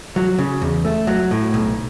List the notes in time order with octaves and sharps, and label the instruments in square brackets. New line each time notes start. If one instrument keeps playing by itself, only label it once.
[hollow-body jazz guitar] F#3
C#3
E2
A3
F#3
A2
B1